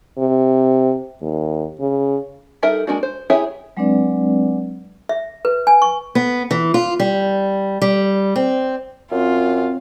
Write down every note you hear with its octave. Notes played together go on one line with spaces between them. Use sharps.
C3
D#2
C#3
G3 D#4 A4 A#4 E5
G#3 A#3 D4 F#4
C5
E4 G4 G#4 C#5 E5
F#3 G#3 C4 D4 B4 D5
E5
B4
G#5
C#6
B3
E3
F4
G3
G3
C4
F#2 C4 F4